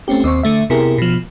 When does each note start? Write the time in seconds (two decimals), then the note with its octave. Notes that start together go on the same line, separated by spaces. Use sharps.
0.08 A3 C4 C#4 G4
0.24 D#2 C4 C5 C#6
0.43 D3 A3 E5
0.70 C3 B3 E4 G4 G#4 A#4
0.98 B2 F3